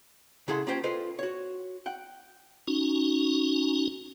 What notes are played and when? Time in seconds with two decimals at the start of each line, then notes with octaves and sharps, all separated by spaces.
0.48 C#3 E4 G#4 A4 F#5 C6
0.67 A#3 C#4 F4 G4 C5 G5
0.84 F4 A4 B4 C5 D#5
1.19 F#4 C#5
1.86 F#5 G5
2.67 C#4 D#4 F#4